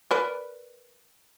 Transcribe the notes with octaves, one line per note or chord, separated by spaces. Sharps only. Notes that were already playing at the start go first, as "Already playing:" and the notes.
A#4 B4 D5